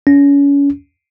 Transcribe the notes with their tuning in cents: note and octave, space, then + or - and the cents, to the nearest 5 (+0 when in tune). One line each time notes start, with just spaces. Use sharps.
C#4 +30